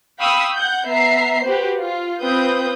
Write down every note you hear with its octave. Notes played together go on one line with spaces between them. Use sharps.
F5 G5 B5 C#6 D#6 E6
F#5 G6
B3 E5 A#5 C7
F#4 G4 B4 C5
F4
C4 F4 B4 D#6 G6